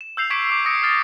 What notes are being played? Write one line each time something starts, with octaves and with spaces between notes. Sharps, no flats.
E7
E6 G6 C7 F7
C#6 D6 G#6 B6 D7 E7
D6 E6 D7
D#6 E6 A#6 C#7 D7
D#6 F6 A6 C7